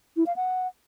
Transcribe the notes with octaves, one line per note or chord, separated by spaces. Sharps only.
E4
F5
F#5